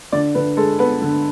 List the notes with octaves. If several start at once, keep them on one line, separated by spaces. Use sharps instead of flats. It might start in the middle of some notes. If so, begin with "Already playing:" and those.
D3 D5
D3 B4
G#3 A4
B3 B4
D3